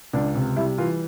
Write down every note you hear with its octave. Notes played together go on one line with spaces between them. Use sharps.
C#2 D4
C3
G3 E4
E3 F4